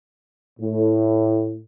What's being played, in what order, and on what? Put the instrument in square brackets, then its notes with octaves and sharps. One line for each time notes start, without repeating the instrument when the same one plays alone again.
[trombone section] A2